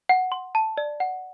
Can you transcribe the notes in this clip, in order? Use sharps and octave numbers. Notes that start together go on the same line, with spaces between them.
F#5
C6
A5
D5
F#5